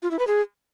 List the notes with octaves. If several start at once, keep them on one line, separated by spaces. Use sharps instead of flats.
F4
E4
B4
G#4